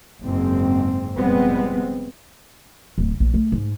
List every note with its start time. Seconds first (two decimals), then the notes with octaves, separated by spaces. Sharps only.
0.24 F#1 G#2 C4
1.17 F1 A#2 G3 G#3 B3 C4
2.98 D1
3.20 A#1
3.34 A3
3.52 G#2